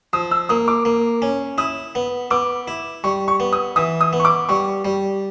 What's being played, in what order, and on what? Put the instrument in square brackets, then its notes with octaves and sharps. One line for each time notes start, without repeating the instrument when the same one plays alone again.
[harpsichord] F3 [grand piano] D#6
[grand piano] E6
[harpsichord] A#3 [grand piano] D#6
[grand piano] D6
[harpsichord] A#3
C#4
[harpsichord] E4 [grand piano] D#6
[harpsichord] B3
[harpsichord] B3 [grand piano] D6
[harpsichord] E4
[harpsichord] G3 [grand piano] C#6
[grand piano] C#6
[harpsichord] B3
[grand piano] D#6
[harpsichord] E3 [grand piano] D#6
[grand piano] D#6
[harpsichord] B3
[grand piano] C#6
D6
[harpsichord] G3 [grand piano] C#6
[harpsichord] G3